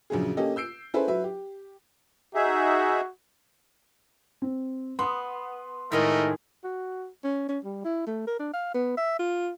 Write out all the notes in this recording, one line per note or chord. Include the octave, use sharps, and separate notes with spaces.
A#1 F#2 C#3 G#4
A#3 C#4 G4 A4 D#5
E6 G6 C7 D7
C#4 E4 G#4 A4 B4 C5
F#3 B4 E5
G4
D#4 F#4 G#4 E5
C4
B3 C6 D#6
A2 D#3 G#3 A3 A#4 D#5
F#4
C#4
C#4
G3
E4
A3
A#4
D4
F5
B3
E5
F4